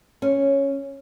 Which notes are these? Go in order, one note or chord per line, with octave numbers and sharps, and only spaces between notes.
C#4